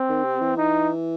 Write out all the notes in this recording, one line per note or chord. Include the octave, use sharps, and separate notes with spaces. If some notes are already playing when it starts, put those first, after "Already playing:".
Already playing: C4
D#3
C3
E3
D#4